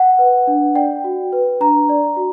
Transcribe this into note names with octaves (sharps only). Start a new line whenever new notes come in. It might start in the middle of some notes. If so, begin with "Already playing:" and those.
Already playing: F#5
B4
D4
D5 G5
F#4
B4
D4 A#5
D5
F#4